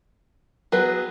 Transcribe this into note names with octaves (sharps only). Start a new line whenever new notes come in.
F#3 B3 G#4 B4